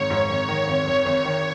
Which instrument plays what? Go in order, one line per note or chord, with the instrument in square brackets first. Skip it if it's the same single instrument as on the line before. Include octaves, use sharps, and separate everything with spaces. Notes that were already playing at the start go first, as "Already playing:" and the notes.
Already playing: [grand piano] G#1 G#2 D#3 [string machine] C#5
[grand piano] G#2
G#1
D#3
G#1
G#1
G#1
D#3